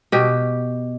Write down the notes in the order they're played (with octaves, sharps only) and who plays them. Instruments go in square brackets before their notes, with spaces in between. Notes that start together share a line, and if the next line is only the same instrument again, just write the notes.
[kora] B2 G4